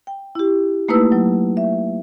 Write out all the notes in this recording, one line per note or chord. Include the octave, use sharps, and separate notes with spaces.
G5
E4 G4
A3 A#3 D#4 E4 B4 E6
F#3
E5